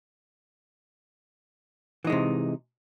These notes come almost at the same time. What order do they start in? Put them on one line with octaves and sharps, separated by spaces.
E3 D#4 G#3 C3